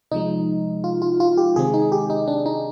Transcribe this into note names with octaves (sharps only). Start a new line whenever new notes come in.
C3 F3 G#3 D#4
F4
F4
F4
G4
C3 D#3 G#3 C4 G#4
D#4
G4
D#4
D4
D#4